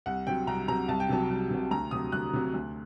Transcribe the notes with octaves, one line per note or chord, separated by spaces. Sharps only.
C2 F#5
C3 F#3 G5
C2 A#5
C3 F#3 A#5
C2 A5
G5
C3 F#3 A5
C2
C3 F#3
D2 A#5
C3 F#3 D#6
D2 F#6
C3 F#3
D2